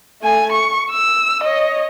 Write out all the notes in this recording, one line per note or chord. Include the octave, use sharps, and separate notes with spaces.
A3 G#5
C#6
E6
C#5 D#5